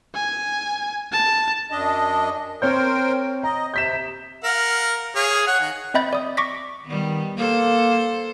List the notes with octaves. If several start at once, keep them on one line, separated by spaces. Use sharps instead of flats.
G#5
A5
F#2 D4 D#5
C4 A#4 C5 C#5 G5 G6
D#5 A#5
C3 G6 B6 E7
A#4 F5 F#5
G#4 C#5 F5
C#5 F#5
D#3
C4 D#5 E5 B5 G6 A6
D5 D#6
C#6 D6 A#6 B6
D#3 G3 B3
A#3 A4 C5